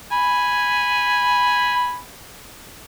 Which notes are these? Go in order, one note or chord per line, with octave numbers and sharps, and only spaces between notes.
G#5 B5